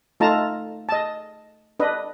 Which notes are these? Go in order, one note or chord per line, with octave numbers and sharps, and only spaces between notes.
A3 D#4 F4 A5 A#5
D#5 A5
D4 B4 D#5